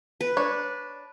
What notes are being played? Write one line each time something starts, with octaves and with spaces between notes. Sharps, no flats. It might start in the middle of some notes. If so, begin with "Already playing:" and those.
B4
D4 C#5